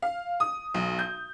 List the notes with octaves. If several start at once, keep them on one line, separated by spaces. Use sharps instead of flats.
F5
D#6
B1
G6